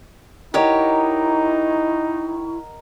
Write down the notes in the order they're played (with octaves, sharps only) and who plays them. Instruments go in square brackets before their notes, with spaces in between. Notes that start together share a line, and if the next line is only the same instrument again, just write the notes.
[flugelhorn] D#4 [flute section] E4 C#6 [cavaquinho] G4 C#5 [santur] A#4 D#5 F#5